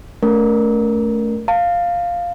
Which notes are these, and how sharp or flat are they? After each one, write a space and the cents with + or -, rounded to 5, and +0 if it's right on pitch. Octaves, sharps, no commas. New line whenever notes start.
A3 +0 C#4 +40 A#4 +20
F5 +0 A5 +40